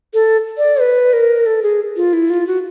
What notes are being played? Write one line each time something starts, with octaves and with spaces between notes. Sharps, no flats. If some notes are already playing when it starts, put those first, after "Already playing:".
A4
D5
B4
A#4
A4
G#4
F4
E4
F4
F#4